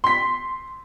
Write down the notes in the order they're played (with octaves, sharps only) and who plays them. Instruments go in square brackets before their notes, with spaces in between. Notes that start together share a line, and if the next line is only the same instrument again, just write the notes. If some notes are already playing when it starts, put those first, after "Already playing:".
[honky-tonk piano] C6 B6